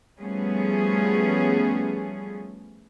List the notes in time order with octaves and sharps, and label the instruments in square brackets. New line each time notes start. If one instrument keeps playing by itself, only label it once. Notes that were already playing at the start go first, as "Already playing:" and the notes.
[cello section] F3 G3 A3 B3 C#4 G#4